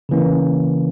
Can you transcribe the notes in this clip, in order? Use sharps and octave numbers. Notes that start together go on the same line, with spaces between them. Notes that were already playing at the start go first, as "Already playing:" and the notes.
C#3 E3 A#3 C#4